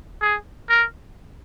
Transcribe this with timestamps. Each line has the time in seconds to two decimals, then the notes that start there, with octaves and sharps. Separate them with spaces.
0.21 G#4
0.69 A#4